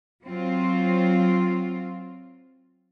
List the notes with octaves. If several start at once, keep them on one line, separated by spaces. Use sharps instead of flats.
F#3 C4 F4